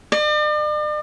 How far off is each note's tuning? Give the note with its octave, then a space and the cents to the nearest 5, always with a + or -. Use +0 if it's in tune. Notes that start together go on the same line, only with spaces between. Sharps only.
D5 +45